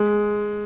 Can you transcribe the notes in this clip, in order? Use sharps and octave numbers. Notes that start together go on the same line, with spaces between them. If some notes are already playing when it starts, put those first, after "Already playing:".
Already playing: G#3